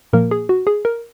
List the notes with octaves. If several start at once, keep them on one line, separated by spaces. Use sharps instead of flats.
A#2 F3 A#3 A#4
G#4
F#4
G#4
A#4